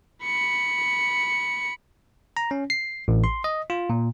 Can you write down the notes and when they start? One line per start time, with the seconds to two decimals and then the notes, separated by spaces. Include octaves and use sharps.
0.23 B5 C#7
2.37 A#5
2.51 C#4
2.70 C7
3.08 A1
3.24 C6
3.44 D#5
3.70 F4
3.90 A#2